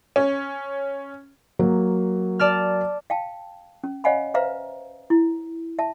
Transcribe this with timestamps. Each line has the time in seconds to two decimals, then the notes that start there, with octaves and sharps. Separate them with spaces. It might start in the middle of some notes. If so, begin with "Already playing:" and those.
0.16 C#4
1.59 F#3 A#3
2.39 D5 A5 F6
3.10 F5 G5 A5
3.84 C#4
4.04 C#5 D#5 F5 F#5 G#5 B5
4.34 B4 C5 E5 F5 A#5
5.10 E4
5.79 E5 A5